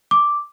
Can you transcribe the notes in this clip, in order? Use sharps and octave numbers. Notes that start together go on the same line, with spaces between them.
D6